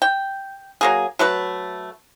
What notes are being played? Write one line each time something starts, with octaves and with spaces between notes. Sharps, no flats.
G5
F#3 A#3 G#4
F#3 A3 B4